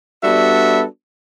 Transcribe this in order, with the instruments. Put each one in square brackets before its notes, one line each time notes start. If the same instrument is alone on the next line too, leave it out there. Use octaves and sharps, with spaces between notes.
[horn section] G3 B3 D4 F#4 A4 E5